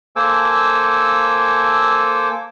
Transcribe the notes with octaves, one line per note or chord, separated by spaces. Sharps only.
A#3 A4 C5 G#5 D6 E6